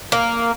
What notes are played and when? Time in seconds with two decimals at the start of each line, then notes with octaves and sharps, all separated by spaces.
0.12 A#3